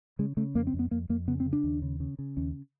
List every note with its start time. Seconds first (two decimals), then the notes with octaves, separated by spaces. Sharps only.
0.19 C#3 G#3
0.37 C#3 A3
0.55 F2 A#3
0.67 C4
0.74 F2
0.79 B3
0.91 F2 A#3
1.09 F2 A#3
1.28 C#3 B3
1.40 C4
1.46 C#3
1.53 D4
1.64 D#2
1.82 C#3
2.00 C#3
2.19 C#3
2.37 D#2 C#4